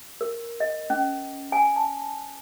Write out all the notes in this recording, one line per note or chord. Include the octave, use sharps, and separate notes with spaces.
A#4
D#5
C#4
G#5
A5